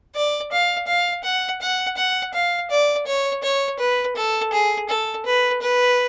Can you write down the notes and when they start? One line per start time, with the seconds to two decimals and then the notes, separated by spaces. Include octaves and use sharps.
0.15 D5
0.52 F5
0.87 F5
1.24 F#5
1.61 F#5
1.97 F#5
2.33 F5
2.70 D5
3.07 C#5
3.43 C#5
3.80 B4
4.16 A4
4.53 G#4
4.89 A4
5.26 B4
5.62 B4